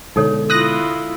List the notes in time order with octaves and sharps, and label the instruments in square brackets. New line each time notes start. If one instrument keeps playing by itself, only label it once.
[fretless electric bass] B2 D3 G#3 [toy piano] D#4 A4 C#5
[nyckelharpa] E4 F4 [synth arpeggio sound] D#6 F#6 A#6